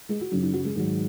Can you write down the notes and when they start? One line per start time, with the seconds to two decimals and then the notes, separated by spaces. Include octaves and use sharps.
0.09 G#3 G#4
0.21 F#4
0.31 F#2 C#3 F#3 D#4
0.43 D#4
0.53 F#3 F#4
0.65 G#3 G#4
0.76 G#2 D#3 F#3